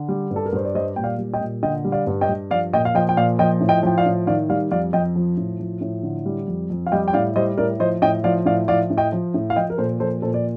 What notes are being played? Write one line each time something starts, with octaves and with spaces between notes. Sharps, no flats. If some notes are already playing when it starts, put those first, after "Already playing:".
Already playing: D3
G3
G2
A4
A#4
G2 C5
D5
G3 C5 D#5
A#2 G5
D5 F5
G3
D#5 G5
A#2
D3 D#5 G5
G3
D5 F5
G2
D#5 G5
G2
F3 D5 F5
A#2 D#5 G5
F5
F3 D#5 G5
G5
A#2 D5 F5
F3 D#5 G5
A2
D#5 G5
F3 G5
D5 F5
A2
D#3 D5 F5
G3 D5 F5
F2 D5 F5
F2 D#5 G5
F3
A2
F3
A2
D3
G3
F2
F2
F5
G3 D#5 G5
G5
A2 D5 F5
G3 C5 D#5
A2 A#4 D5
F3 C5 D#5
A2 D#5 G5
F3 D5 F5
A2 D5 F5
F3 D5 F5
A2
D#5 G5
F3
A2
F5
F3 D#5 G5
A#4
A#2 A4 C5
F3 A4 C5
A#2 A4 C5
D5